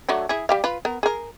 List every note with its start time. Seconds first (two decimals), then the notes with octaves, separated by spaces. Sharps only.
0.09 F#3 A3 D4
0.29 E4 G#4
0.49 G3 G4 F5
0.64 F4 B4
0.85 B3 A#4
1.03 G#4 A#4